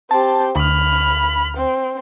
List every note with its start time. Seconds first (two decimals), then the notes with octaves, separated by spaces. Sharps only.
0.11 C4 G4 A5
0.56 D2 B5 F6
1.57 C4